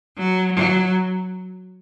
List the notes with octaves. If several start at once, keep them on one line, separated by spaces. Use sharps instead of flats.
F#3
F#3